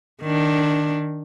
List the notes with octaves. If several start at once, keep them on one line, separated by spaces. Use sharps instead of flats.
D#3 D4